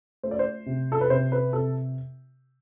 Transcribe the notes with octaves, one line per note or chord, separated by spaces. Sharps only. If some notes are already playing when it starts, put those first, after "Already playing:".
A3 C5
D5
C5
C3
A4
B4
C3 C5
B4
C3 A4